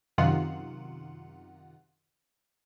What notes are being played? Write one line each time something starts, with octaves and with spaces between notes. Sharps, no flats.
F#2 C3 D#3 F4 F#5